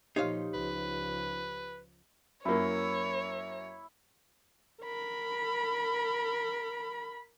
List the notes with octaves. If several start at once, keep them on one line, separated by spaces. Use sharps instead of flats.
A#2 F3 D#4 G4 C#5 F5
C#2 F3 B4
F#2 A#3 E4 C#5
A#4 B5